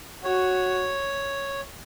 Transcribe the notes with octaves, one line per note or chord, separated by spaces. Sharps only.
F#4 C#5